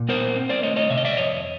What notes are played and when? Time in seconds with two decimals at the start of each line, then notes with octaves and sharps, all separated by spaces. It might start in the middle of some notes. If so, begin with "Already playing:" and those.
Already playing: A#2
0.08 B3 A#4 C5
0.36 C4
0.49 C5 D5
0.63 A3 C#5 D#5
0.76 C#5 D#5
0.90 C3 E5
0.97 D#5
1.05 D5 E5
1.17 F2 C#5 D#5